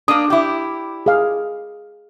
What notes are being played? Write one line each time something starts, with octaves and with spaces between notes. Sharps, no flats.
A#3 D4 D#6
E4 G4
G#4 F5